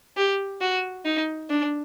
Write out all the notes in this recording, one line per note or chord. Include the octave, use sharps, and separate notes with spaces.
G4
F#4
D#4
D4